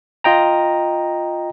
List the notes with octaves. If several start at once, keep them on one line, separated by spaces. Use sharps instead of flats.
F4 D#5 G5 A#5